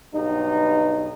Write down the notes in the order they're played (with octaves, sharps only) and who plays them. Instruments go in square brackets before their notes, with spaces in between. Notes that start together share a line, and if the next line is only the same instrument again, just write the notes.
[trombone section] B1 G2 D#4